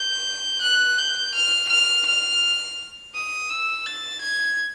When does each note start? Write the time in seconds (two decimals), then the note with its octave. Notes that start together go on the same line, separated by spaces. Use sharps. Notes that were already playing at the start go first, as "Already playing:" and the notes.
Already playing: G6
0.62 F#6
0.98 G6
1.35 F6
1.70 F6
2.06 F6
3.15 D#6
3.50 E6
3.86 A6
4.22 G#6